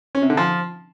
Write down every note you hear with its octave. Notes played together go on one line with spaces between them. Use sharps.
C#4
C3
D3
F3